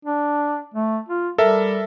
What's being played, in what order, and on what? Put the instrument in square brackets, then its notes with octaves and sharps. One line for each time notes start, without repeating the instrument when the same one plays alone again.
[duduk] D4
A3
F4
[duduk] G3 [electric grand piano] A4 A#4 E5